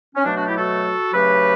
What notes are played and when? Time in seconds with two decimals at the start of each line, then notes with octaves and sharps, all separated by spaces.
0.15 C#4
0.24 B2 F#3 A3 D4
0.35 D4 F#4
0.46 E4 G4
0.57 F#4 A4
1.13 C#3 F#3 A3 G4 B4